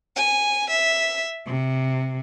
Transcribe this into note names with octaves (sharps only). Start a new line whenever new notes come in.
G#5
E5
C3